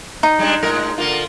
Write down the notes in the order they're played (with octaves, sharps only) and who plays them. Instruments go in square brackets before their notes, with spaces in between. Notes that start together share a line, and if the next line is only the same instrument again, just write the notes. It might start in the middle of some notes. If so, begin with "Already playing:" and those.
[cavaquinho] D#4
[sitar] G3 G#3 D4
A2 G#3 A#4
D3 A#3 F4